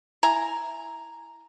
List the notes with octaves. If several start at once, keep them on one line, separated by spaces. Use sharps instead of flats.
E4 G#5 A#5